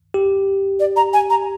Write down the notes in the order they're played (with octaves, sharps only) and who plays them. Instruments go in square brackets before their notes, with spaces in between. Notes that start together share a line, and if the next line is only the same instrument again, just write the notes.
[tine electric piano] G4
[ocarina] D5
A#5
G#5
A#5